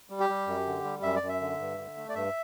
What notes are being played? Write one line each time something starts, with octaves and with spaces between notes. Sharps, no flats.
G3
G4
G3
F#2
D3
G3
F#2 E5
D5
F#2
E5
D3
G2
D3
A3
D5
G2 E5